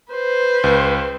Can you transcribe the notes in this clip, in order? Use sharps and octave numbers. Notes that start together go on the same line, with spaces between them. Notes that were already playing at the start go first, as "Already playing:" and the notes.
B4 C5
C#2